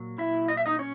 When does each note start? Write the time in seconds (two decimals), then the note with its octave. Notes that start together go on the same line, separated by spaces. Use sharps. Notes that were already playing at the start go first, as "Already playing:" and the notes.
Already playing: A#2 F#3
0.18 E4 E5
0.48 D#5
0.57 E5
0.66 D#4 D#5
0.79 C#4 C#5